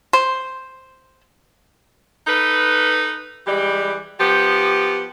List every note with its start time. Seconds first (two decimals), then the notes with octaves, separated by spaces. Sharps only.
0.13 C5
2.27 D#4 A4 B4
3.47 E3 G3 G#3 G4
4.19 F3 B3 G4